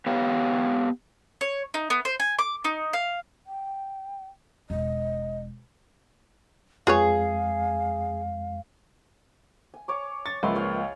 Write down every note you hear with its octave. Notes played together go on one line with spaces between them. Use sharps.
B3 G4 B4 C#5 F5 G5
C#5
D#4
B3
C5
G#5
D6
D#4
F5
G5
E1 D#5
F2 G#3 F4 G#4 B4 C#5 F5
G#5
C#5 C#6 D6
C#6 A6
C#2 F3 A#3 B4 E5 C6 C#6
G#4 C#5 F5